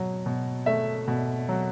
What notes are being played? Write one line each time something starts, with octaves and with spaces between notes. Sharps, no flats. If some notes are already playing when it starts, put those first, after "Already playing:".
Already playing: B2 F#3
B2
A3 E5
B2
F#3